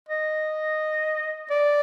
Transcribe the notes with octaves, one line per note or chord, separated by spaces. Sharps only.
D#5
D5